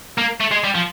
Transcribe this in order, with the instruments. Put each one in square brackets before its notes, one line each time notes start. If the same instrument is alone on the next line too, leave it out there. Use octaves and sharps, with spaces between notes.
[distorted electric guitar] A#3
A3
G#3
G3
F3